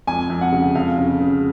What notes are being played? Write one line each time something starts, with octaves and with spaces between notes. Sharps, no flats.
F2 G#5
F2
F#5
C#3
F2 F5
C#3
C#3